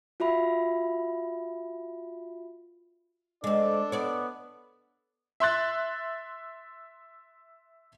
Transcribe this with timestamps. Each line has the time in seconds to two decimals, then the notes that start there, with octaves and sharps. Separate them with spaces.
0.20 F4 F#4 E5 B5
3.44 G#3 C4 D4 A4 D5 D#5
3.92 B3 C#5 D5
5.40 E5 C6 F#6 A6